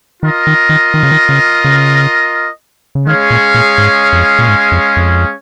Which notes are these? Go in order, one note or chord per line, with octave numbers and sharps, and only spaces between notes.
D#3 F4 A#4 D#5
D#3
D#3
D#3
C#3
D#3
C#3
C#3
C#3
D#3 G#3 C#4 G#4 C#5 F5
A#2
A#2
G#2
F2
A#2
G#2
F2
F2